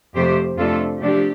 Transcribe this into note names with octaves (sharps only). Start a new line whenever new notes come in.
F2 C3 A3 G4 C5
F2 C3 A3 D4 F4 A4
C3 F3 A3 D4 G4